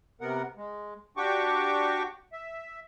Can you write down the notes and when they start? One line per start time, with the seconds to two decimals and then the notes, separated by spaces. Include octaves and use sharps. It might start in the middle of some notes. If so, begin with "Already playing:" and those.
0.21 C3 B3 A#4 F#5
0.57 G#3
1.17 D4 F#4 G4 G5 C#6 D6
2.33 E5